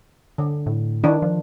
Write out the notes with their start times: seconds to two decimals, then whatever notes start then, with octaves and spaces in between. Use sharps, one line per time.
0.38 D3
0.66 A2
1.04 D#3 D4 E4
1.22 F3